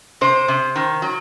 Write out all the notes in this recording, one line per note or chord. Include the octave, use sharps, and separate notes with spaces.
C3 C5
C3
D#3
F#3